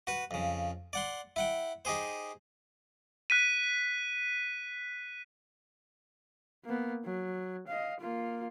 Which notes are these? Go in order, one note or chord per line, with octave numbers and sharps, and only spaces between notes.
F#4 B4
F2 C#3
D5 F#5 C6
E4 F#5 G5
D#4 G4 G#4 C5
F#6 B6 D#7
A#3 B3
F#3
D#5 F5
A#3 F4